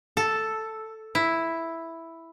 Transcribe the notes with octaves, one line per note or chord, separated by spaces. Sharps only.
A4
E4